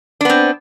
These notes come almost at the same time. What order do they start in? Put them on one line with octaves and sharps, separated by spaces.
D4 B3 C4